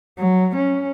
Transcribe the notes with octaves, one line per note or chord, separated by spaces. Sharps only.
F#3
C#4